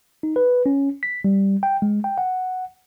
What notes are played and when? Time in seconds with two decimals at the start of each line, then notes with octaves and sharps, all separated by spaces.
0.23 D#4
0.36 B4
0.66 C#4
1.03 B6
1.24 G3
1.63 G5
1.82 G#3
2.04 G5
2.18 F#5